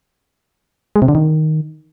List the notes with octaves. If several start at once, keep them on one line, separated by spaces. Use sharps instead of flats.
G#3
C3
D3
D#3